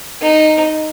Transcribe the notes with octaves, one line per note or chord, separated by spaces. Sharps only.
D#4